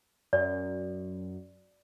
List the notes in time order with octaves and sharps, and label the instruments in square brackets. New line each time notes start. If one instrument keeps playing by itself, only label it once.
[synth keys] F#2 [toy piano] D5